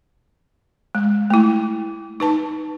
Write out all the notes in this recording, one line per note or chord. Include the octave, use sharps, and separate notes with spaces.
G#3
A3 E4
D#4 B4 A5